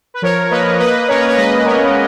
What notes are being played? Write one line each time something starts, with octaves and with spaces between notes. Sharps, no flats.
B4
F3 A#4 C#5
A#3 B4 D#5
A#3 B4 D#5
C#4 A#4 C#5
B4
C#5
G#3 B4 D#5
B3 A#4 C#5